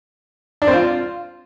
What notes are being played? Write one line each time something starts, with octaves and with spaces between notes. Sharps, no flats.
D4
C4
F4